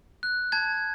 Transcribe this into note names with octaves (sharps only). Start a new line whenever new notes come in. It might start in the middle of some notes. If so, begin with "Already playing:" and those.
F#6
A5 G#6